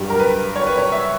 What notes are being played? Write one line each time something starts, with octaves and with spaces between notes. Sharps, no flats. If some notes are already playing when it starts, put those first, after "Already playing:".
Already playing: G2 F#3 G4
A#4
B4
C#5
B4
C#5
E5